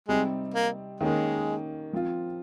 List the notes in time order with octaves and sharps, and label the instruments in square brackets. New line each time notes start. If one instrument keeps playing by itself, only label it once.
[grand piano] C3 G3 C4 D#4 [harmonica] G#3
[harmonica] A#3
[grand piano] D#3 A#3 C#4 [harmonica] G#3
[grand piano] F3 C4 F4